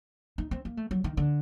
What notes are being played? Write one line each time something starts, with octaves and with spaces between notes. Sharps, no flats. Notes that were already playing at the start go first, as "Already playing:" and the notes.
D#4
C4
A#3
A3
F#3
D#3
D3